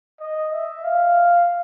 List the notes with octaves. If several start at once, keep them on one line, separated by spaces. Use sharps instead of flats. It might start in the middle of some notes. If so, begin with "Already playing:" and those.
D#5
E5
F5